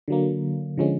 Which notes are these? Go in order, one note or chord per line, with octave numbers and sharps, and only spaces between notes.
D3 F#3 A#3
D3 F3 G#3 C#4